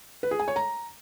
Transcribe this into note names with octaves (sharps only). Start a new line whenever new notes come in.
B4
G#4
G#5
C#5
A#5